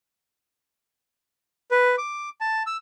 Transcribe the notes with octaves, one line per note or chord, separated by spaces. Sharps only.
B4
D6
A5
E6